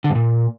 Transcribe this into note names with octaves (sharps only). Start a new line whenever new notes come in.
D3
G2
A#2